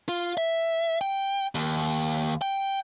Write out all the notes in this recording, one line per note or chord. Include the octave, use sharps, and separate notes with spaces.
F4
E5
G5
D#2
G5